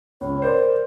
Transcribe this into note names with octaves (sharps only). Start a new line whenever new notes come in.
C#2 C#5
A#4 C5 D5